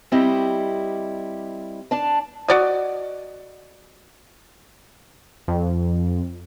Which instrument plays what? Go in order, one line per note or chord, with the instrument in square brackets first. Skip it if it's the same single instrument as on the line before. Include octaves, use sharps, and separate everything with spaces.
[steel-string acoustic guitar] G3 C4 E4 G4 D#5
D4 D5 A5
[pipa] F#4 D5 D#5
[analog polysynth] F2